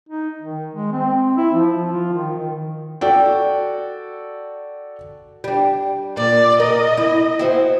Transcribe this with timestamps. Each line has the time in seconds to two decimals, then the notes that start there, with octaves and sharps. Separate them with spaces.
0.09 D#4
0.41 D#3
0.74 G#3
0.92 C4
1.22 C4
1.37 E4
1.54 F3
1.92 F4
2.13 D#3
2.37 D#3
3.01 F#4 A4 D5 G5
5.44 G3 D4
6.17 A#2 D5
6.60 A#4 D#5
6.97 E4
7.39 E4 F#4 C5